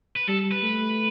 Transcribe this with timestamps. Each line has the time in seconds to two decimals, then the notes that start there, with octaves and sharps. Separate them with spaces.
0.16 B4
0.28 G3 A4
0.51 B4
0.63 A3